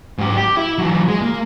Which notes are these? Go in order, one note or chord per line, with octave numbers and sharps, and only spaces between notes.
G#2 G4
G4
E4
E3 F#3
G#3
A#3